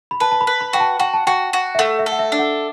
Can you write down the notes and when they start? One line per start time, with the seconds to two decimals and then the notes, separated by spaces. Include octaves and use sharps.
0.11 B5
0.20 B4 A5
0.31 A5
0.41 B5
0.47 B4
0.61 B5
0.73 F#4 G5
0.80 A5
0.99 F#4 G5
1.14 A5
1.27 F#4 G5
1.53 F#4
1.75 E5
1.79 A3 F#5
1.99 E5
2.06 A4
2.12 F#5
2.19 E5
2.32 D4
2.39 F#5